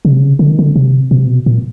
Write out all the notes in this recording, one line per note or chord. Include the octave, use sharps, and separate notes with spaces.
C#3
C3
C#3
D3
D#3
D3
C3
B2
C3
B2
A#2